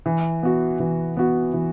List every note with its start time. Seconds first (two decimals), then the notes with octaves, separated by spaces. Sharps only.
0.06 E3
0.43 B3 F#4
0.80 E3
1.17 B3 F#4
1.54 E3